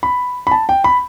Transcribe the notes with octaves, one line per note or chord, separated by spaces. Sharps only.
B5
B5
A5
G5
B5